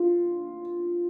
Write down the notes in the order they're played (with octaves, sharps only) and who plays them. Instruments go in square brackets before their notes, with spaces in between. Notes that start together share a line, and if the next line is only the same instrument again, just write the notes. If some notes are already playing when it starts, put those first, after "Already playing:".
Already playing: [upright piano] F4